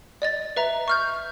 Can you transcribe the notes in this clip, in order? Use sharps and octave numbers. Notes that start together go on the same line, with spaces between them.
D5 D#5 A6
B4 E5 A#5
C#6 F6 G6